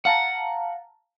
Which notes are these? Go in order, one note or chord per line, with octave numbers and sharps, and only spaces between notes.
F5 F#5 A5 A#5